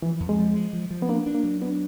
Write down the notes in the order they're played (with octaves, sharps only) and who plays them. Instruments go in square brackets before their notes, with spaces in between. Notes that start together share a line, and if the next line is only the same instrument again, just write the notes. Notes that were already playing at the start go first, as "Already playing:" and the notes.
[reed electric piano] E3 [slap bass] F3
[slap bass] F2
[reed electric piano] G#3
[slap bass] F3
G#3
F3
F3
[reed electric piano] B3
[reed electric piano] A#3 [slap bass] D4
[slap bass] D4
[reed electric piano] A#3
[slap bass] F#3
[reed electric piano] B3 [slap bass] D4